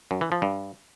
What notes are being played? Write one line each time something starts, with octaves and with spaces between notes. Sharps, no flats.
F#2
E3
F3
G2